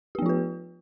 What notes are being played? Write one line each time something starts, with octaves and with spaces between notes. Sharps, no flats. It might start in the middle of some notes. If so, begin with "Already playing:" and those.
F3 B3 F4 G4 B4